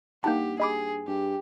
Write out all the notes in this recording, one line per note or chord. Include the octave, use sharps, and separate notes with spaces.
G2 A#3 D#4 G4 F#5 A5 G6
G#4 D#5 B5 D6
G2 G4